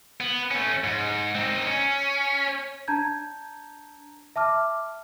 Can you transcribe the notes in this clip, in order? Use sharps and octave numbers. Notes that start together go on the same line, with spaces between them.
B3
A3 C#4
G#2
C4 D#4
C#4
D4 A5 A#5 G6 G#6
E5 A5 D6 F6